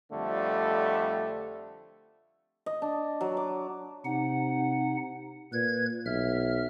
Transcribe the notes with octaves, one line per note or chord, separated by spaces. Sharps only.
F2 D3 G3 A3
D#5
D4
F#3
D6
C3 D#4 F#5
A#2 B4 G#6
B1 E5 F6